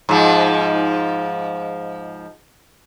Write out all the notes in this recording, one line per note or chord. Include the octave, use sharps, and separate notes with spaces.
G#2 F3